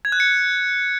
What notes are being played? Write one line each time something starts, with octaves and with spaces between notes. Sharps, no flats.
G#6
F#6
C#7